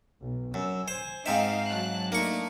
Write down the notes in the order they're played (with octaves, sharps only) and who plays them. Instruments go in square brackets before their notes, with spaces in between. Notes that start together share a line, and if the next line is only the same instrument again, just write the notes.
[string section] B1
[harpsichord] F#2 [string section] E6
[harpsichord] C5 [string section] G#5
[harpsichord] G#2 C4 E5 [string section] D#4 F5
[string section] F#3 A5 F#6
[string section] A3 D4 D#4 [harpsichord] A#3 C#6